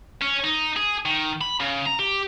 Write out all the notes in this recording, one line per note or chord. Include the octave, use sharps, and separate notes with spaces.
C#4
D#4
G#4
D#3
B5
C#3
A#5
G4